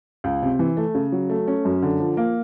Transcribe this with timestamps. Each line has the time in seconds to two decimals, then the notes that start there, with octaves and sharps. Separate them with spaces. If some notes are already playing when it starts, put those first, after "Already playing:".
0.24 C#2
0.43 C3
0.59 E3
0.77 A3
0.95 C#3
1.12 F#3
1.30 A3
1.47 C#4
1.65 F#2
1.82 D3
2.00 F3
2.17 A#3